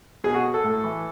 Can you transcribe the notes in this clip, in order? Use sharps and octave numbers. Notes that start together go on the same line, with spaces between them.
B2 G#4
F#4
A4
A2
E3